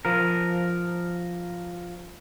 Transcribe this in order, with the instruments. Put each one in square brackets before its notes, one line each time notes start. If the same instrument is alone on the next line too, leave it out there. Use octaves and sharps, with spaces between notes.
[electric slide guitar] F3 A#4